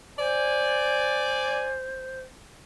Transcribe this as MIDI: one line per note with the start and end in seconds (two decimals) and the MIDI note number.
0.18 2.21 72
0.18 1.78 74
0.18 1.78 80